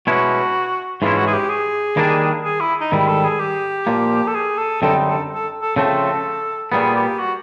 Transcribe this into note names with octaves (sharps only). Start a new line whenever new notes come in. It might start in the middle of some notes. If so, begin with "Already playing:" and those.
B2 G#3 C#4 E4 F#4
G#2 E3 G#3 C#4 E4 F4
F#4
G#4
G4
G#4
D#3 G3 A#3 D4
G#4
E4
D#4
G#2 D#3 G3 E4
A4
G#4
G4
A#2 F3 A#3
A4
G#4
A4
F#2 D3 G3 C4 D#4 A4
A4
A4
A4
C#3 F3 A3 C4 A4
A#2 G3 B3 G#4
G4
F#4